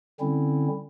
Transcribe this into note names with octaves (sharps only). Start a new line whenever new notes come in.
D3 G3 C4 C#4 E4